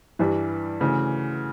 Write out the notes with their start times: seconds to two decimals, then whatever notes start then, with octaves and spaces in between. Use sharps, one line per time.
0.19 G2 E3 G3
0.81 D2 C#3 E3